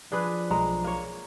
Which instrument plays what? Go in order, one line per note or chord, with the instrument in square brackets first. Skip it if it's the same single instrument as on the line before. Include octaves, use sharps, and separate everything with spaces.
[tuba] F3 [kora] D4 G#4 B4
[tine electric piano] B1 A#5 [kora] G#3
[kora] A#3 C#5